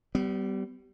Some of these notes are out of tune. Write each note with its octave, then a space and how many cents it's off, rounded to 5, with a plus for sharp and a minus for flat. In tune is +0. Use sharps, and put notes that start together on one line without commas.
G3 -20 B3 +30